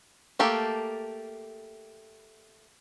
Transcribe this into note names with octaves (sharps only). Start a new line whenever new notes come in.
A3 A#3 G4 A4